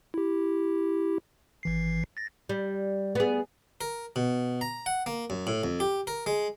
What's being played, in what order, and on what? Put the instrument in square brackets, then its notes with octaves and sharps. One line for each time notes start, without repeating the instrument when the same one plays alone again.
[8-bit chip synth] E4 G4
G#1 E3 C7
A6 A#6
[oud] G3
B3 G#4
[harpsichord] A#4
B2
A#5
F#5
A#3
F#2
A2
F2
G4
A#4
G#3